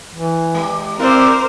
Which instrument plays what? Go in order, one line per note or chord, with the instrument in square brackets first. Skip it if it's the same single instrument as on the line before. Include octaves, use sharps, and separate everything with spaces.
[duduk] E3
[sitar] G#3 G4
[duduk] C4 [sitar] E4 D5 [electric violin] A#4 C5